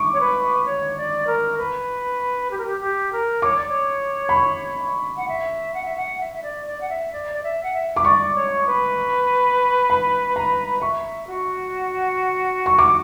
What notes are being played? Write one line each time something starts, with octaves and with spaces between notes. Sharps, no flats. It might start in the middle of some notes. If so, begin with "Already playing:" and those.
Already playing: C#6 D6
C#5
B4
C#5
D5
A#4
B4
G4
A#4
G4
G4
A#4
C#5 D6
D5
C#5
B5
C#6
F#5
E5
F#5
E5
F#5
E5
E5
D5
D5
F#5
E5
D5
D5
E5
F#5
E5
D6
D5 C#6
C#5
B4
B5
A#5
E5 C#6
F#4
C#6
D6